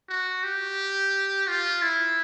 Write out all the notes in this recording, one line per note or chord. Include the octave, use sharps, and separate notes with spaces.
F#4
G4
F4
E4